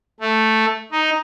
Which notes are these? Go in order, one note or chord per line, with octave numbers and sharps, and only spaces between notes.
A3
D#4